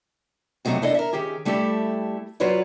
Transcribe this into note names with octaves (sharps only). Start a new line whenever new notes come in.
F2 C3 F#3 A3 D#4 F#4
D4 E4 A4 D5 D#5
A#4 E5
D#3 C#4 G4 G#4
G3 A3 E4 G4 A4
F#3 F4 F#4 B4 C#5 D5